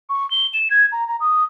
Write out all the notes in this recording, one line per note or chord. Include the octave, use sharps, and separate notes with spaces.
C#6
G7
E7
G#6
A#5
A#5
D#6